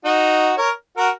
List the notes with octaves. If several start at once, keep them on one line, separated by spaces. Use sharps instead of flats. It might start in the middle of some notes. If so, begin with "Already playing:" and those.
D#4 F#4
A#4 C#5
F#4 A#4